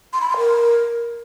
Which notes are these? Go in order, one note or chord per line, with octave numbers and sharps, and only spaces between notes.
C6
B5
C6
A#4